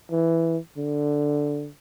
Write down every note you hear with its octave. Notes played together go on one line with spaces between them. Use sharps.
E3
D3